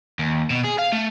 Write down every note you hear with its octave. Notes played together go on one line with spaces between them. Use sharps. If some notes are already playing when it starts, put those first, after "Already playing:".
D#2
B2
G#4
F5
A3